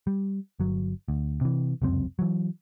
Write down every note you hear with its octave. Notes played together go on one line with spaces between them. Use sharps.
G3
G1 F#3
D2
C3 E3
F1 C#2 F#2 C4
E3 F#3